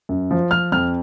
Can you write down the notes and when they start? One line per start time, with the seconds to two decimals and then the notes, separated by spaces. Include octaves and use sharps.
0.09 F#2
0.31 F3
0.51 F3 F6
0.72 F2 F6